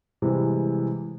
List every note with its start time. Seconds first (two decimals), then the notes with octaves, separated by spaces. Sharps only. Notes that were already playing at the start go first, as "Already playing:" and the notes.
0.22 C3 E3 G3 G#3